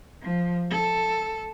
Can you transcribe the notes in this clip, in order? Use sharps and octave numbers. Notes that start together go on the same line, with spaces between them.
F3
A4